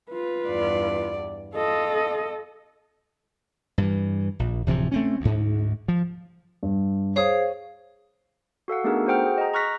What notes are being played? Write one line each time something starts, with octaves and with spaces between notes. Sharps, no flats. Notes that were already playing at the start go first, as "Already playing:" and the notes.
F4 B4
E2 G2 D5
F4 A4 D#5
G2 E3
A#1
D1 C3 E3 F3
A3 C4 C#4
D2 G#2
F3
G2
G#4 C5 C#5 F5 D#6
F#4 A4 F5 F#5
A3 B3 D4 D#4 G#4 A#4
F#4 A4 C5 F#5 G5 F6
G#4
D#5 A#5
A#5 C#6 F6 F#6 A#6 B6